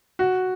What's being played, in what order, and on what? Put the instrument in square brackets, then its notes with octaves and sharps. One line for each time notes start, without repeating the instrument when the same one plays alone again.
[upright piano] F#4